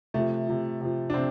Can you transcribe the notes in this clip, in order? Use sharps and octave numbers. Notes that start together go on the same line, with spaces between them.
C3 F3 A3
C3 F3
C3 F3
D4
C3 C4